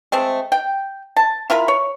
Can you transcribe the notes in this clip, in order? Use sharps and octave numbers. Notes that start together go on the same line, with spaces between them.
G#3 A3 C4
G5
A5
E4 F4 A#4 B5
C#5